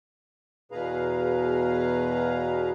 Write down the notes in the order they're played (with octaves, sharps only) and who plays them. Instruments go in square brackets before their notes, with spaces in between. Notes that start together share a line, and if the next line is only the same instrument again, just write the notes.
[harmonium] E2 B2 G#4 B4 F5 A#5